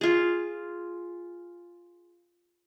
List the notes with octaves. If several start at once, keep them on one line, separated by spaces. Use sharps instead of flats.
F4 G#4